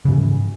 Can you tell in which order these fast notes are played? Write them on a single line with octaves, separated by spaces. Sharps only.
C#3 G#2 E3